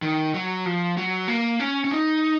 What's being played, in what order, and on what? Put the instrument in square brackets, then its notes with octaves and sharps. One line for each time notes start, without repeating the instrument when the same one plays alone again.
[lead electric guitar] D#3
F#3
F3
F#3
A#3
C#4
C#4
D#4